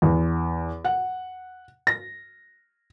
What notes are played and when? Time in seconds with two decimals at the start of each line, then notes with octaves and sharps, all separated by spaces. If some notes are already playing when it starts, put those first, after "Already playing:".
0.02 E2
0.85 F#5
1.87 A#6